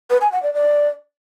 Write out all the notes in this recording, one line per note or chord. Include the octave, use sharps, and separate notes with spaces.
B4
G#5
F#5
D5
D5